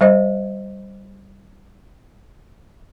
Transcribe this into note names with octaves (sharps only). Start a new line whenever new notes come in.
G3 C5 D#5